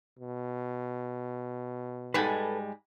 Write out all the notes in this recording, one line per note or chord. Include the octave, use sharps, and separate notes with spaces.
B2
G#2 G3 G#3 A4 B4